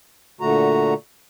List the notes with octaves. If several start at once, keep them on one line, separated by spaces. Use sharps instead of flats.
A#2 D3 A3 F#4 A#5